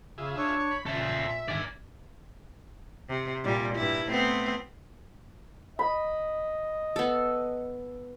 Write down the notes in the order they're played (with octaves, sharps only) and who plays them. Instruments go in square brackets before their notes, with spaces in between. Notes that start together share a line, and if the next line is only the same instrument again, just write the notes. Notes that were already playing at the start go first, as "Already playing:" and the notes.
[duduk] C#3 [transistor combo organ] F4 G#4 E5
[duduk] D4 [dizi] C#5
[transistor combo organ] B5
[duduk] A#2 [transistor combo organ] C#3 [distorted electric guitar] A4 C5 [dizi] E5
[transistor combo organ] G2 D3 D#3 [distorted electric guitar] D5 G#5
[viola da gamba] C3
A#2 G3
G2 E4
A3 B3 C4
[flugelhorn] D#5 [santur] B5
[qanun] B3 A4